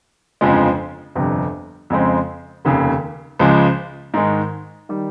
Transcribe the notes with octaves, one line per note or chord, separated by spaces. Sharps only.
G1 F2 C#3 F3 G#3
G1 F2 C3 G3
F2 C#3 G#3 C4
F1 D#2 C#3
C#2 C#3 F3 G#3
G#2 D#3 G#3
D#3 G3